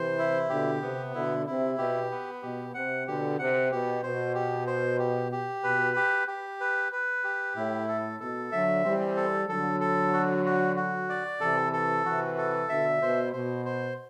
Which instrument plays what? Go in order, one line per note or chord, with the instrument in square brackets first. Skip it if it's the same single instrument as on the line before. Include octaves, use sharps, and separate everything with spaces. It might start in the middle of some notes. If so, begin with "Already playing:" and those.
Already playing: [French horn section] C3 E3 [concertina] C5
[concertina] E4
[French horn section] B2 D3 [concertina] G4
[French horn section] C3 [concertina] B3
[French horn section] B2 D3 [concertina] E4
[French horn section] C3 [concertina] E4
[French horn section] B2 [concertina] G4
[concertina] B3
[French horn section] B2 [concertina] G4
[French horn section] C3 [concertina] F#5
[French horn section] B2 D3 [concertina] G4
[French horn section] C3 [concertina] F#5
[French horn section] B2 [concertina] G4
[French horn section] B2 [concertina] C5
[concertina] G4
C5
G4
G4
[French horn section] B2 [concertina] B4
[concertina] G4
G4
B4
B4
G4
[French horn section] A2 [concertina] E4
[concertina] A4
[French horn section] B2 [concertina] A4
[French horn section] D3 F#3 [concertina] E5
[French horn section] E3 G3 [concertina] C4
[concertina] A4
[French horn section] D3 F#3 [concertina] A4
[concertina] A4
F#4
F#4
F#4
D5
[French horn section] C3 E3 [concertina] A4
[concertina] A4
[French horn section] C3 E3 [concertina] F#4
[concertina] A4
[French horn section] B2 D3 [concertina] E5
[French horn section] B2 [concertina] C5
[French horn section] B2 [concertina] C5
[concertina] C5